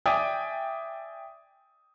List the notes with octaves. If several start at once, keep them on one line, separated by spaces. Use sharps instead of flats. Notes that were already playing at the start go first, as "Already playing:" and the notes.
D5 E5 G5 G#5 D#6